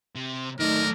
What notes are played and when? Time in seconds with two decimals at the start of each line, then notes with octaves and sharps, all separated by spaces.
0.16 C3
0.60 D#2 F#3 A3 D#4 A#4 D5